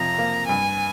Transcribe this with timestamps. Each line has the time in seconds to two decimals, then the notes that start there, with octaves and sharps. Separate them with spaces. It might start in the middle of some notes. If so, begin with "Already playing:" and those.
Already playing: F2 C3 F3 A#5
0.18 A#3
0.48 G2 G#5